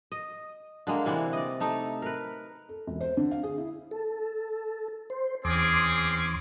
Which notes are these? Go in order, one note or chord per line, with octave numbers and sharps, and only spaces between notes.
D#5
D3 G#3 A#3
C3 E3 G3 E4
D5 D#5
A3 D#4 A4
A#4 B4
A4
E1
C5
D3
F5
G#4
E4
A4
C5
E2 C4 C#4 G#4 C6 D6